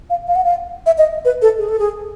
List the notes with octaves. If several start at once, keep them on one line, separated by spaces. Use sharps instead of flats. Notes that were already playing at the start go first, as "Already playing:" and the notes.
F5
F5
F#5
F5
E5
D#5
B4
A4
G#4
A4
G#4